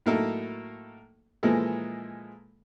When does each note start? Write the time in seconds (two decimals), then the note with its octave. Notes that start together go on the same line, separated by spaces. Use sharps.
0.06 A2 F#3 A#3 D#4 E4 A4
1.43 A#2 E3 F3 G#3 A#3 A4